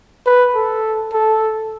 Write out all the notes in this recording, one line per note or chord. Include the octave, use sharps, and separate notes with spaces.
B4
A4
A4